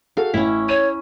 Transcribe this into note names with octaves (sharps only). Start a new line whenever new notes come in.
F#4 G#4 A4 F5
A1 C#4 E4
C#5 D#7